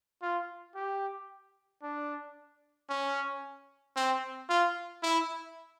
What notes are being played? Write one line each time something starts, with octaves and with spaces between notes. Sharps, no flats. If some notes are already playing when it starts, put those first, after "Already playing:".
F4
G4
D4
C#4
C4
F4
E4